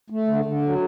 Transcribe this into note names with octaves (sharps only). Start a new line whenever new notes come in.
A3
D3
D3
F#3